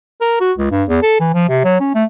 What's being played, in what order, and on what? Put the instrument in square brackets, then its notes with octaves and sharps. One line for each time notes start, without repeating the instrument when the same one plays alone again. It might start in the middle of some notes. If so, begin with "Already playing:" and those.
[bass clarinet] A#4
F#4
C#2
G2
E2
A4
E3
F3
C3
F#3
C#4
A3